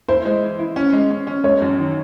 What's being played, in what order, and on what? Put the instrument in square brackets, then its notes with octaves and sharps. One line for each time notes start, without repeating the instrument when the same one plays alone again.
[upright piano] E4 [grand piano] C5
[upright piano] G#3
E3
E4
C#4
G#3
C#4
C#4
[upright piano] G#3 [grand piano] C#5
[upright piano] F#2
D#3